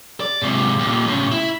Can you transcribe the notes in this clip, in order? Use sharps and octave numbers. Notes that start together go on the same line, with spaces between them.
D5
G#2 C3
D#2 A#2
A2 C#3
E4